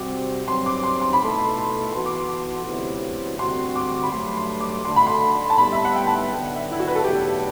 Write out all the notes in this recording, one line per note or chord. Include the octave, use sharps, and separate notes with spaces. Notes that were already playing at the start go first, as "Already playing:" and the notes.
Already playing: C3 G3 C4 F#4 D6
G2 F#3 C4 C6
D6
C6
C6
B5
B2 A3 E4 A4 C6
E3 B3 F#4 A4 C6
D6
C6
D2 C3 F#3 B3 E4
D2 D3 G3 C4 F#4 C6
D6
B5
G2 F#3 A3 C6
C6
D6
D3 A3 D4 F#4 A4 C6
B5
C6
A5
A2 G3 B3 B5
E5
F#5
G5
A5
D3 F#3 B3 G5
F#5
E5
E4
F#4
B4
A4
E2 B2 F#3 A3 D4 G4